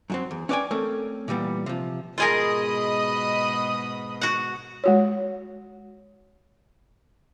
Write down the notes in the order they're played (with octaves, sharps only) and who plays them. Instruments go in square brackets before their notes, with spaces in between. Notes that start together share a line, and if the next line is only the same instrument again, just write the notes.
[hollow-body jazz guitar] F#2 F#3 C4
E2
C#4 B4 D5 E5 G5 G#5
A3 C4 C#4 A#4
A#2 E3 G3 B3
C3 F3
[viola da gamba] G#2 B2 [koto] F4 G#4 A#4 [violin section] D#5 B5 D#6
[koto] F#4 F#5
[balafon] G#3 F#4 C#5